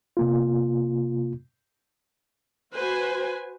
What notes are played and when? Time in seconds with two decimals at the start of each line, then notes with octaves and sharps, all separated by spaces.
0.17 C3 A#3 F4
2.75 F#4 B4 C5 G#5